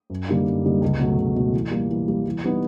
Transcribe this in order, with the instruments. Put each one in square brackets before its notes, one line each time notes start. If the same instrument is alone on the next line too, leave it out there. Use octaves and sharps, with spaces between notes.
[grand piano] F#2
D3 G3 A#3 D#4
F#2
D3 G3 A#3 D#4
C#2
B2 F#3 A3
C#2
B2 F#3 A3
E3
G3 A#3
E3
G3 A#3
E3
G3 B3 D#4